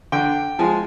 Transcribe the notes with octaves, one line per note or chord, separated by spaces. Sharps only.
D3 G5
F3 G#3 G#5